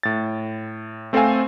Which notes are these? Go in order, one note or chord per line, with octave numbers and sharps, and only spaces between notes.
A2 A6
A3 C4 A4 C5 F5 G#5